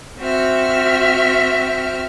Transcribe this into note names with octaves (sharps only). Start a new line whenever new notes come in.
C4 F#4 E5 F6